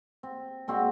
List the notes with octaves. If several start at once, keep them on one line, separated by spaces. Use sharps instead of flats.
C4
A#2 G#3 C4 F#4